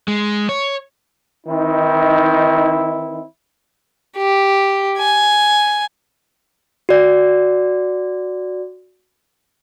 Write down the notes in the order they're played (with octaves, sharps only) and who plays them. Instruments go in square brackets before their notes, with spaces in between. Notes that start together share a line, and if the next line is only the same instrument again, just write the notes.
[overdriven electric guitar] G#3
C#5
[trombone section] D#3 E3 C4 D#4 E4
[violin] G4
G#5
[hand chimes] F#4 D5